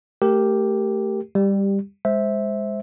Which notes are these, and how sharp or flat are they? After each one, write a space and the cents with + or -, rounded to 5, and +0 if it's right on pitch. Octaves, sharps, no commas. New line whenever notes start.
A3 +0 G4 +0 A#4 -10
G3 +15 G4 +0
G#3 -10 C5 +0 E5 -10